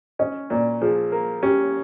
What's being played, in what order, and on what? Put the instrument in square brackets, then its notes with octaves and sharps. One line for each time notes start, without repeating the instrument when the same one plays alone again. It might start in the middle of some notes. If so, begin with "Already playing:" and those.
[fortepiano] C#4 [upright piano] D#5
[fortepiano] A#2 [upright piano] D5
[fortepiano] F3 [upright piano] G#4
[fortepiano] A#3
[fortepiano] C#4 [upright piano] G4